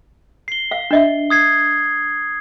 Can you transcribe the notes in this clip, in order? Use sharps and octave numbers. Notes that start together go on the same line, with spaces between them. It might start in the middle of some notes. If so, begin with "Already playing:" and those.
C7 G7
F5
D4 D#5 E5
D#6 G#6 C7